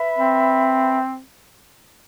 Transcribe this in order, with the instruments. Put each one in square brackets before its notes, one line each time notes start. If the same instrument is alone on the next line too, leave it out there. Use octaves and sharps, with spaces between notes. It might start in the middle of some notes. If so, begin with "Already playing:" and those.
Already playing: [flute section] B4 E5 B5
[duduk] C4